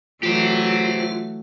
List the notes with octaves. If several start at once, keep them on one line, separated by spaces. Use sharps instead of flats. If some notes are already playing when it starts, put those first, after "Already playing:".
E3 F#3 A3 F4 G4 C5